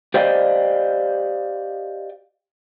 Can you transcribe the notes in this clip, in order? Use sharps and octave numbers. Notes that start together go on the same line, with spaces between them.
G4 C5 D5 D#5 F5 G5